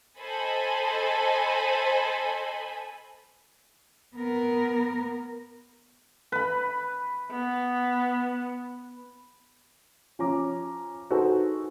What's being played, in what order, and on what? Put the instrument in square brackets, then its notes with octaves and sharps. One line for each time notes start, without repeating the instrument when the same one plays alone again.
[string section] A4 C5 D#5 G#5 B5
[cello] B3 A#4
[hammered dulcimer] B4 B5
[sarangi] B3
[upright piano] F3 C#4 A#5 D6
D#4 F#4 G#4 A4 B4 C5